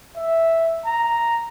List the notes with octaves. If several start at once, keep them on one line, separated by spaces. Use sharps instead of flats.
E5
A#5